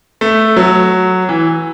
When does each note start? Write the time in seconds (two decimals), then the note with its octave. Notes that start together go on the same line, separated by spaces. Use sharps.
0.21 A3
0.56 F#3
1.29 E3